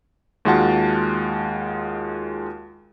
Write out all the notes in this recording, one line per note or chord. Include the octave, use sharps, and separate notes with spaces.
D#2 G#3 F4 F#4 F#5 A5